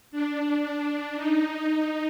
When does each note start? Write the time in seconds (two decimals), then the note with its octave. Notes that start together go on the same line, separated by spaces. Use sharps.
0.11 D4
1.15 D#4